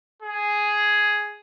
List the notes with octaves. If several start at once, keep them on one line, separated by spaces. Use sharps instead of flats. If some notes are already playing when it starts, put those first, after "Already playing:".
G#4